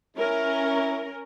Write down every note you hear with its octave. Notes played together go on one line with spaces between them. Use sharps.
C#4 E4 A#4